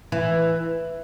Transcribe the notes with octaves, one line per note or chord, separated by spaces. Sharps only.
E3